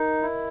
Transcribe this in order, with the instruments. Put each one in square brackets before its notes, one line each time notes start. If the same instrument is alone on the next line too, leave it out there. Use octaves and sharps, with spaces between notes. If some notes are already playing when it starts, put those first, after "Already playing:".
Already playing: [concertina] D#4 [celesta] A#4 D#5
[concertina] E4